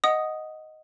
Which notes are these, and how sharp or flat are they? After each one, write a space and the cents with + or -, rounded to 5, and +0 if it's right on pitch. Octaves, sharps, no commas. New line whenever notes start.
D#5 +0 F#5 +0 D#6 +0